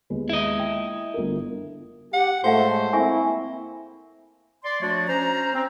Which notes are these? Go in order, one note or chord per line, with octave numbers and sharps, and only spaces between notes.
D#2 G#3 B3
E4 D#5
G5
G1 A3 A#4
G4 F#5
A2 G#3 A3 F4 C5 F5 F#5
A#3 C4 E4 E5 G#5 C#6
D5 C6
F3 A3 D4 F#4 C#5 D5
C#4 C5 A#5
C4